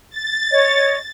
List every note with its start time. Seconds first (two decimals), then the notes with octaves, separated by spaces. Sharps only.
0.10 A6
0.51 C#5 D#5